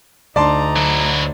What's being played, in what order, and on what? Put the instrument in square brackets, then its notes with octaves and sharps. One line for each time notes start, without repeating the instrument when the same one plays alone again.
[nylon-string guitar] D2 [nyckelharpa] D#4 A#5 [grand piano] D5 A5 C6
[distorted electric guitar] F#3 E4